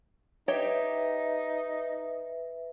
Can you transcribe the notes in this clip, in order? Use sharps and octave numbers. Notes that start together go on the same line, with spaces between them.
D#4 G4 B4 C#5 E5 G5